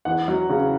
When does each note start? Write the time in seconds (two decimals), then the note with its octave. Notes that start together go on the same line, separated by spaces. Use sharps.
0.05 E2 F#5
0.28 F#3
0.49 C#3